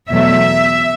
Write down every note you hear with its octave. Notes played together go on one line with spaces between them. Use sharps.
E2 B2 F#3 A3 E5